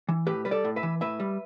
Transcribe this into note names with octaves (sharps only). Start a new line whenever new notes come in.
E3
A2 G4 B4
G3 B4
A4 D5
A2
B4 E5
E3
A2 B4 E5
G3